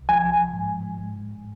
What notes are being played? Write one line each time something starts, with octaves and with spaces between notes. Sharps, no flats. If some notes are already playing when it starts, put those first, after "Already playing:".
Already playing: C2
F3 G#5
G#2
G#2